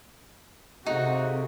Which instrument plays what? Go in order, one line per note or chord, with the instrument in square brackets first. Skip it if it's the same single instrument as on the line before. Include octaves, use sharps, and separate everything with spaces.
[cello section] C3 [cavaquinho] D#4 [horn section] F#4 [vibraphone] G#4 A4 F5